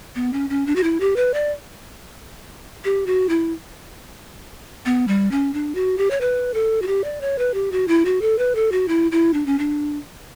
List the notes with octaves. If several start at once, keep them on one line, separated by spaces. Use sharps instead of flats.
B3
C#4
C#4
D4
F#4
E4
G4
B4
D5
G4
F#4
E4
B3
G3
C#4
D4
F#4
G4
C#5
B4
A4
F#4
G4
D5
C#5
B4
G4
F#4
E4
F#4
A4
B4
A4
F#4
E4
E4
D4
C#4
D4